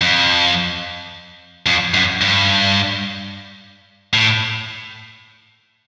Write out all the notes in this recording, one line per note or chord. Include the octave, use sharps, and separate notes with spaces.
F2
F2
F#2
G2
A2